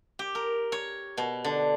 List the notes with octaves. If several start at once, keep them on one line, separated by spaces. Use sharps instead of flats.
G4
A#4
C#5
B2
D3